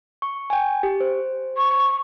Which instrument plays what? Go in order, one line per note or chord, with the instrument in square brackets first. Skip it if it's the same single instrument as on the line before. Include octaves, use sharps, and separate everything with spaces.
[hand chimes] C#6
G5 G#5
G4
C5
[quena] C#6